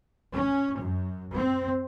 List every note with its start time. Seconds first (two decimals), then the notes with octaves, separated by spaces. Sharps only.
0.33 C#4
0.80 F#2
1.35 C4